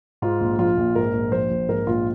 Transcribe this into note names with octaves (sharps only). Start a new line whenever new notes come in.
G#2 F4
A#1
F3 F4
A#1
G#2 A#4
A#1
F3 C5
A#1
G#2 A#4
A#1 F4